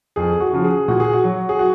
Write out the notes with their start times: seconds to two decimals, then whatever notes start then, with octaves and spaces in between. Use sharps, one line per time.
0.16 F2 G#4
0.40 F#4
0.53 C#3 F3
0.64 G#4
0.88 A#2 F#4
1.00 G#4
1.13 F#4
1.24 F#3
1.49 G#4
1.59 F#4